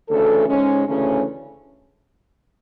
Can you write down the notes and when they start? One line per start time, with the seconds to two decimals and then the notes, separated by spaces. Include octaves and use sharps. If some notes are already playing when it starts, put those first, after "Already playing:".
0.10 D2 C#3 E3 A4
0.48 G#2 G#3 C#4
0.87 D2 C#3 E3 A3 C#4